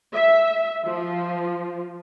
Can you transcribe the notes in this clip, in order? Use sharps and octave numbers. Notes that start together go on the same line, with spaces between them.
E5
F3